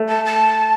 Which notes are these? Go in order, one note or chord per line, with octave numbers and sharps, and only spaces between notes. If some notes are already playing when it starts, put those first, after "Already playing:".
Already playing: A3
A5
A5